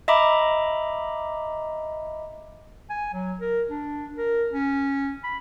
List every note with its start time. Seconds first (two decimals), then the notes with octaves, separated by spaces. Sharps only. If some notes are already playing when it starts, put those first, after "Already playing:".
0.08 D#5 E5 A#5 B5 D6
2.90 G#5
3.13 F#3
3.41 A#4
3.69 D4
4.17 A#4
4.53 C#4
5.24 B5